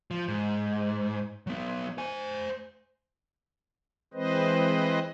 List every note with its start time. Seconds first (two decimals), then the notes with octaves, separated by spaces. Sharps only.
0.11 F3
0.28 G#2
1.47 F#3 B3
1.98 C5 G#5
4.14 E3 G#3 C4 B4 C5 D#5